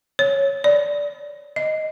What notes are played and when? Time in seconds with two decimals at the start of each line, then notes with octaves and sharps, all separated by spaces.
0.19 C#5
0.64 D5
1.56 D#5